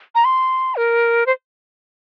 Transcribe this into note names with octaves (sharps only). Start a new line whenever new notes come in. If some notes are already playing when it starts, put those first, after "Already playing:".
A#5
C6
A#4
C5